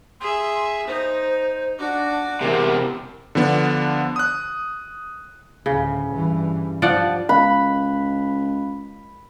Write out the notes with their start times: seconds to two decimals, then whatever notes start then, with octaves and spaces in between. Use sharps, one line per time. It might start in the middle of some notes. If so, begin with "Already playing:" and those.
0.21 G#4 E5 C6
0.88 D#4 C5
1.79 D4 F#4 D6
2.41 E2 C3 A#4
3.35 D3 F3 B3 D4
4.16 D#6 F#6
5.66 D2 A2 C#3
6.14 G2 E3
6.82 G2 F3 D4 D5 F#5
7.29 C#2 F5 B5 F#6